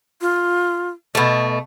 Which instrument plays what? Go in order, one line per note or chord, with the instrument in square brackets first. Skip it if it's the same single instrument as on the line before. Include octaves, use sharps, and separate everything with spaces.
[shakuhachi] F4
[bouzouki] B2 A3 [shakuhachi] D#5